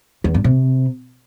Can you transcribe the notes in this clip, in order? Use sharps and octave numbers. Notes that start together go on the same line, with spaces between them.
E2
G2
C3